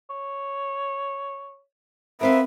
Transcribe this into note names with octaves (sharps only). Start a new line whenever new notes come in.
C#5
B3 C4 A#4 C5 E5 F5